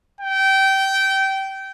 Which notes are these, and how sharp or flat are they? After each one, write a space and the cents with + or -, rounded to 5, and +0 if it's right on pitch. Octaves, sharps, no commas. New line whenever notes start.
G5 -20